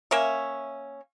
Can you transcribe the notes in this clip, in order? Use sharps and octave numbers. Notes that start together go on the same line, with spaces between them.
A#3 C#4 E5